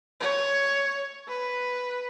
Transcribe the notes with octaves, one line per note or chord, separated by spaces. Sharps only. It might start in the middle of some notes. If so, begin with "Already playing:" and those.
C#5
B4